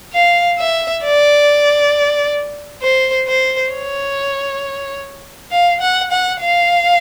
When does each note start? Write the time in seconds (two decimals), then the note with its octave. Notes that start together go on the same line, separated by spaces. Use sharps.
0.13 F5
0.59 E5
1.03 D5
2.82 C5
3.27 C5
3.72 C#5
5.52 F5
5.81 F#5
6.11 F#5
6.41 F5